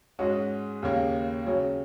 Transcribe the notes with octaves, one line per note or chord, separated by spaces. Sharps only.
G#2 G#3 C#4 F#4
D#2 C#3 A#3
C#3 F#3 C#4